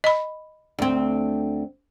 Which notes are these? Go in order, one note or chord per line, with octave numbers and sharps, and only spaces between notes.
D#5 B5
D2 C4